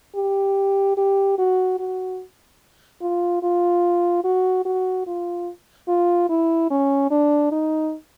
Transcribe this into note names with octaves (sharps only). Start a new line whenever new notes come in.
G4
G4
F#4
F#4
F4
F4
F#4
F#4
F4
F4
E4
C#4
D4
D#4